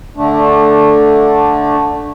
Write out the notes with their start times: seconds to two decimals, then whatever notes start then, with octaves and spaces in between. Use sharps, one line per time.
0.17 D3 A3 D4